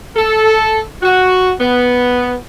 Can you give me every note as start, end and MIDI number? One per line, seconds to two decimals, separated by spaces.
0.16 0.79 69
1.03 1.52 66
1.60 2.35 59